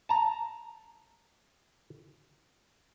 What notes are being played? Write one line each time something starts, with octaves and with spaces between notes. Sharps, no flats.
A5 A#5